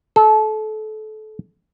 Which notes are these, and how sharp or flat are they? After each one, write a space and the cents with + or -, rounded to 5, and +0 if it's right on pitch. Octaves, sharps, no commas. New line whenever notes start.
A4 -25